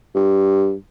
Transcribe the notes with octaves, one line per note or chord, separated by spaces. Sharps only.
G2